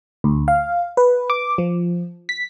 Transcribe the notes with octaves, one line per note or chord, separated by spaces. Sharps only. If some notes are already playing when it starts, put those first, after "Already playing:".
D2
F5
B4
D6
F3
B6